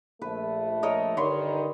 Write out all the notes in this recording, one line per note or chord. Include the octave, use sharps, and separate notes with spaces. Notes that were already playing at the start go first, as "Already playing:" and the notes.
A#1 A3 B4
A#4 C#5 D#5
G2 D3 D#3 C#5 B5 C6